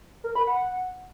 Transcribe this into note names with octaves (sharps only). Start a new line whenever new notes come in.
A#4
B5
F#5